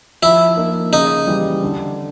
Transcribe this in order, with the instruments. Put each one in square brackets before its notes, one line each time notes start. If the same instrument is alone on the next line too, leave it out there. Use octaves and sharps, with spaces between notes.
[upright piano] F3 [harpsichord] E4
[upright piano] A#3 D#4
[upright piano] C#3 [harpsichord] D#4
[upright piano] E3 G3
D3